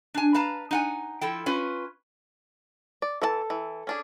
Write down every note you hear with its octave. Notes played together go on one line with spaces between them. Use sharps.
D4 G#5
B4 F5 A5 A#5
D#4 F#5 G#5
F3 E4 A4 G5
C#4 F4 B4
D5
E3 F#4 A4 A5
E3
C#4 D4 G#4